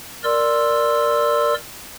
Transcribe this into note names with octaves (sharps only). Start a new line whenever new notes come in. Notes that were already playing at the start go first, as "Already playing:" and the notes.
A#4 D5 C6 E6